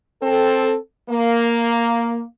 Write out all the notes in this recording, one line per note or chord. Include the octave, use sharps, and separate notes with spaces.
C4 A4
A#3